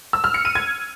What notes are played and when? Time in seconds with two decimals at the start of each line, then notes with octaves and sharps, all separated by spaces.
0.13 E6
0.24 F6
0.34 C#7
0.45 D#7
0.55 G#6